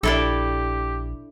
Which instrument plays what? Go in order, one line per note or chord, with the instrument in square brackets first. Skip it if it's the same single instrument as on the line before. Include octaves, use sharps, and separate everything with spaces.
[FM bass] A#1 [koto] D4 E4 A4 [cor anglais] G4